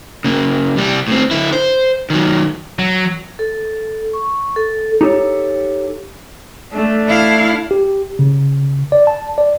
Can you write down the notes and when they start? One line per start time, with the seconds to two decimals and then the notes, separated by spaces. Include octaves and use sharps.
0.24 C#3 A#3
0.76 C2 G3
1.08 A2 C4
1.31 D3 E4
1.53 C5
2.10 D#3 F#3
2.79 F#3
3.39 A4
4.13 C#6
4.56 A4
5.01 D#4 G4 A4 C#5
6.73 A3 D4
7.08 E4 F5
7.71 G4
8.19 C#3
8.92 D5
9.07 A5
9.38 D5